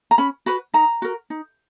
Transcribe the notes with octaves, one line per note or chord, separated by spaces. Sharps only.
A#5
C#4 B5
F#4 B4 B5
D#4 A#5
F#4 A#4
D#4